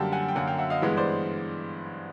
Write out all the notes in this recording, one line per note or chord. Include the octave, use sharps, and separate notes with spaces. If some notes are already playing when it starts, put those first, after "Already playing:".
Already playing: F#2 D3 G3 A#3 G5 A5
F#5 G#5
G5
F#2 D3 F#3 A#3 F#5 G#5
F5 G5
E5 F#5
D#5 F5
G2 E3 G#3 B3
C5 D5